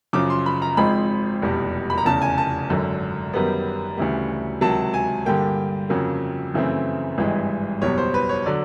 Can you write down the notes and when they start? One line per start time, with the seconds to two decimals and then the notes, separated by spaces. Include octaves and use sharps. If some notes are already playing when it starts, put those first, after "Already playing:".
0.13 F#2 C#3 F3 D6
0.30 C6
0.46 B5
0.62 A#5
0.77 G#1 G#2 F3 G#3 C4 B5
1.42 F1 E2 B2 G3
1.90 B5
1.98 A#5
2.05 F1 E2 C#3 A5
2.22 G#5
2.38 A5
2.70 G#1 F#2 D3
3.33 F#2 D#3 G3 B3
3.97 D2 C#3 E3 G3
4.61 C#2 C3 D#3 F#3 A5
4.94 G#5
5.26 G2 D3 G3 A#3 G5
5.89 F2 C#3 F#3 A#3
6.54 F#2 C#3 E3 A3 C4
7.18 G#1 G2 E3 G#3
7.82 F#1 E2 B2 G3 C#5
7.98 C5
8.14 B4
8.29 C#5
8.46 D3 F#3 D5